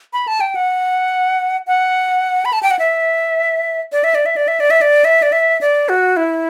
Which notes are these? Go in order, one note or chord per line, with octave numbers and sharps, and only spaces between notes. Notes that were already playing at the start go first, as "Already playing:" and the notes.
B5
A5
G5
F#5
F#5
B5
A5
G5
F#5
E5
D5
E5
D5
E5
D5
E5
D5
E5
D5
E5
D5
E5
D5
F#4
E4